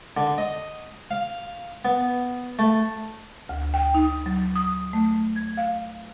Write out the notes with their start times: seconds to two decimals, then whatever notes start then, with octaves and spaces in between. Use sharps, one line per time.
0.17 D3
0.38 D#5
1.11 F5
1.85 B3
2.59 A3
3.49 D2
3.74 G5
3.95 D#4
4.26 F#3
4.56 D#6
4.93 A3
5.36 G#6
5.57 F5